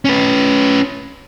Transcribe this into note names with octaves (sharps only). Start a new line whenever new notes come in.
C#4 B4